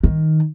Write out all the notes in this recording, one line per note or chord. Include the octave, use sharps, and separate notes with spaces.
D#3